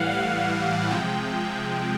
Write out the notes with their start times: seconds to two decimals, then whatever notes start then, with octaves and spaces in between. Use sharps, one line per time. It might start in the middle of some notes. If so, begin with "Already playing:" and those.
Already playing: A2 E3 G3 F5 F#5
0.11 F#5
0.91 C3 F3 G#3 G5